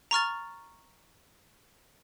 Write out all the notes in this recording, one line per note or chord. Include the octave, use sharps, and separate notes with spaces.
A#5 C#6 F6 A6